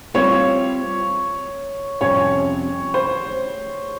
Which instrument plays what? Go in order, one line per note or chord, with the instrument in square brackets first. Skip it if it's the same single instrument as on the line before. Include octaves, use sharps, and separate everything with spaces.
[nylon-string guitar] G3 C4 F4 C5 [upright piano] C#5
[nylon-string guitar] F2 C3 G3 C#4 [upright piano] C#5
[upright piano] C5